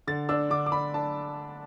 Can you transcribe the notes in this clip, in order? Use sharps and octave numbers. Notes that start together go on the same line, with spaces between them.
D3 A6
D4 E6
D3 D6
D6
D4 B5
D4 A5